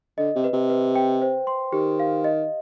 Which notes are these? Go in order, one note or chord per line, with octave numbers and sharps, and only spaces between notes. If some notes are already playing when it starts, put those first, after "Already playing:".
D3 D#5
C3
B4
C3
B4
G5
C5
C6
D#3 G4
F5
D#5